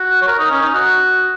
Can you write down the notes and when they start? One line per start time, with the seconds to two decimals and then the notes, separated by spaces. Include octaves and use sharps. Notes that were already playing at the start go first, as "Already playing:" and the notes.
Already playing: F#4
0.22 C#5
0.28 A#4
0.39 D#4
0.51 C#4
0.62 D#4
0.74 F#4